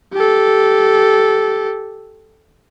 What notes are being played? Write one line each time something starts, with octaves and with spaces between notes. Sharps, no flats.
G4 A4